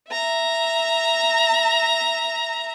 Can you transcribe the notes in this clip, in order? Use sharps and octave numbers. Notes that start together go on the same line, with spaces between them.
E5 A#5